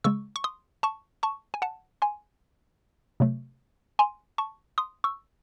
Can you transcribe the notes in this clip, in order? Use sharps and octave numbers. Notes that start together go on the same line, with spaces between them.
C#3 G#3 C#6 E6
C#6
C6 D#6
A5 C#6
A5 C#6
G#5
F#5 A5
G#5 C6
C3 F#3 A3
G#5 C6
A5 C#6
C6 D#6
C#6 E6